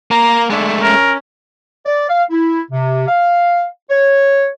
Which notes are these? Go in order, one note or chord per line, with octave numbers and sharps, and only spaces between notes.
A#3 A#5
D3 G#3 A3
C#4 A#4
D5
F5
E4
C3
F5
C#5